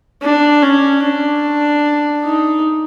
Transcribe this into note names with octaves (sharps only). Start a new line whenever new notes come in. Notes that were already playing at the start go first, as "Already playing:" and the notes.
D4
C#4
D4
D#4